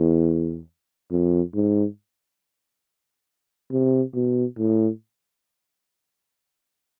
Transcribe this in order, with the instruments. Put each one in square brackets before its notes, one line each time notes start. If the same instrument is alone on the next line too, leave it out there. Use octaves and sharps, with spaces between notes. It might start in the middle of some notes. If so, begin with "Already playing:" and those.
Already playing: [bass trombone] E2
F2
G#2
C3
B2
A2